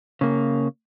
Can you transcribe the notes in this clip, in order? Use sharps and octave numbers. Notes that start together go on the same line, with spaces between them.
C#3 A#3